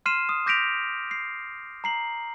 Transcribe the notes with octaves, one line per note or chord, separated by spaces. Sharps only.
C6 F6 C7 D#7 E7
D#6
D6 G6 A#6 B6 D7 F7
C7
A#5 C7 F#7